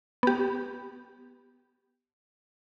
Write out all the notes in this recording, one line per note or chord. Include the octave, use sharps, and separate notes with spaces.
B3 G4